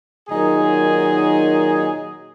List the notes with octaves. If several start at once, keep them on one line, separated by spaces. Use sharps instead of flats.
A#2 D#3 F#3 D#4 G#4 G#5